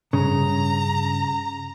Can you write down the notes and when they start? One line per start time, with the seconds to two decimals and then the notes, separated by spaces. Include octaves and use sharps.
0.13 G2 C#3 A#5